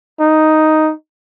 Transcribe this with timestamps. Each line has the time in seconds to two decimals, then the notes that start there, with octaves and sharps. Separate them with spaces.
0.20 D#4